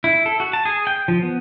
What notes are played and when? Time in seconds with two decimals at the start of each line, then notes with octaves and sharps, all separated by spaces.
0.04 E4
0.26 A4
0.40 F#4
0.53 A5
0.65 G#4
0.87 G5
1.08 F3
1.22 B3